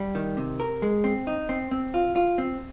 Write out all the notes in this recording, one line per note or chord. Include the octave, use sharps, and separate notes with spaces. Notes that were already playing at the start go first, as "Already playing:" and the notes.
Already playing: G3
D#3
C3
A#4
G#3
C4
D#4
C4
C4
F4
F4
C4